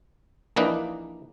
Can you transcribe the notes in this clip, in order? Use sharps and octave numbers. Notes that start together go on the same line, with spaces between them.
A#1 E3 A#3 D4 D#4 B4